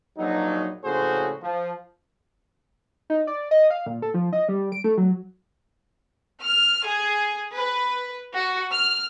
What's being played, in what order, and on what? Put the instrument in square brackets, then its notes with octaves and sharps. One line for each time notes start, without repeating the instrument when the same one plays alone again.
[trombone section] A#1 F#3 D#4
A#1 A2 C#3 F#4 G#4 C5
F3
[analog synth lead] D#4
D5
D#5
F5
A#2
A4
F3
D#5
G3
D7
A3
F#3
[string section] F6
G#4
B4
F#4
F6